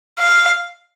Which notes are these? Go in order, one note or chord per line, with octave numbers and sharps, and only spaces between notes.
F5